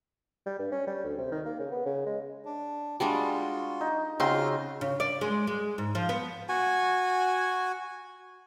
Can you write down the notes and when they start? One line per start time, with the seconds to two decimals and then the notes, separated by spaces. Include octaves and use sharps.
0.46 G3
0.59 G2
0.72 C#4
0.87 G3
1.04 D2
1.18 C3
1.32 D#3
1.46 A#3
1.60 C#3
1.71 B3
1.86 C#3
2.06 G#3
2.45 D4
3.00 G3 G#3 D4 F4 F#4
3.81 D#4
4.20 C#3 C4 D#4 F4 F#4 C6 F6
4.81 C#3
5.00 D5
5.21 G#3
5.47 G#3
5.78 G#2
5.95 F3
6.09 B3
6.49 F#4 G#5